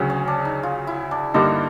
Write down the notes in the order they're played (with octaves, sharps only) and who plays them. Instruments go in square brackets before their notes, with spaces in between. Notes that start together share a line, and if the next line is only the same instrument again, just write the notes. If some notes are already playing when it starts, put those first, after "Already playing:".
Already playing: [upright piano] D2 C#3 F#3
[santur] C#4
D4
D#4
F4
E4
D4
[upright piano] G2 D3 G3 A#3 D#4 [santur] D4